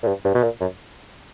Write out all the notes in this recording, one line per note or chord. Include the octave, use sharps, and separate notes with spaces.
A#2
G2
G2
B2
A#2
F#2